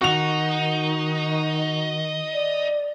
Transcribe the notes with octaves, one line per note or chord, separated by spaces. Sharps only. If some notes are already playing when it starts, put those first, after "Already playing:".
D#3 D#4 F#4 F7
D5